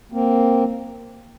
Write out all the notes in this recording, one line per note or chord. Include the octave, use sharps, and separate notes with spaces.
A#3 C4